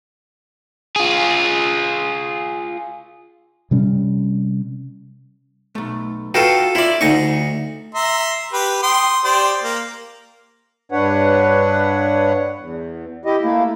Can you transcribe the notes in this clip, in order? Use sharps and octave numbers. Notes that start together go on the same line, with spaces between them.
F4 G#4
C3 G3 C#4
B1 A3
D#4 F4 F#4 A4 B4 G5
E4 F4 D5
D2 D#4 D#5 C#6
E5 A#5 C6
G4 B4
G5 C6 D#6
G4 C5 D5
A#3
G2 D4 B4 C#5 F#5
E2
E4 G4 D#5
A3 A#3 E4